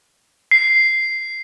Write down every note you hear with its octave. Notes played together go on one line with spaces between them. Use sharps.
C7